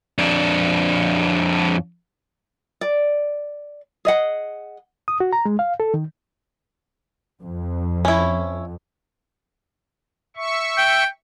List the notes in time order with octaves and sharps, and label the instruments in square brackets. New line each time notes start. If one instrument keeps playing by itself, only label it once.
[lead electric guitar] F2 D4
[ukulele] D5
G#4 D#5 F#5
[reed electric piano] D#6
F#4
A#5
G#3
F5
A4
D#3
[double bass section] F2
[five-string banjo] C#4 E4
[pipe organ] E5 C#6
[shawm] G5